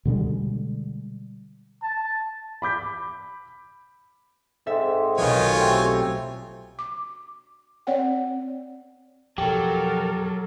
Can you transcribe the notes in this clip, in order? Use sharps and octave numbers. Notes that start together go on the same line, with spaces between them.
B2 D3 G3 G#3
A5
B5 D6 G6 B6
G#2 C4 A4 E5
B1 D#3 F#3 F4 B4 C#5 G#5
A3 C4 G4
D6
C4 C#5 D5 F#5 G5
F2 B2 F3 F#3 G4 A4 A#4